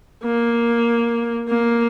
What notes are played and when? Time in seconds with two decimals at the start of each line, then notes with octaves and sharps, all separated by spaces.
0.24 A#3
1.48 A#3